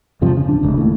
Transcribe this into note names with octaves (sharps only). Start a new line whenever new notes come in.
E2 G2 C3 F3
C#3
D1 D4
F1 C#2
D#2 A2